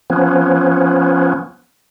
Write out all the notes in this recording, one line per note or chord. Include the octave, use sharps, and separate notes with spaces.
F3 B3 C#4